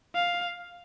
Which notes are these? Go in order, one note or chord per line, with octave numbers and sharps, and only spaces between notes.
F5